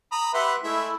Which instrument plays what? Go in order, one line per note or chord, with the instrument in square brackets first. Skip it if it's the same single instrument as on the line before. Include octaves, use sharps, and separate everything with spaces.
[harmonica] A#5 B5 D#6
[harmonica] G4 F#5 C6 [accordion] B4 E5
[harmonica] G#3 E5 [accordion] A3 E4